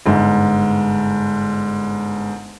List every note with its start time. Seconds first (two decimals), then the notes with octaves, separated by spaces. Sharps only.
0.06 G1 G#2